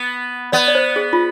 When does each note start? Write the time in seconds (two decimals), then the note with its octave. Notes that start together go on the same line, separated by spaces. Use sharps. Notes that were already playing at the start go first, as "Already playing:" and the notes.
Already playing: B3
0.52 B3 D5
0.68 D5
0.75 C5
0.96 G#4
1.13 F4